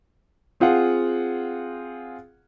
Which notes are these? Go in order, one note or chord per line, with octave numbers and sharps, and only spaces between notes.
C4 F4 G#4 F5 F#5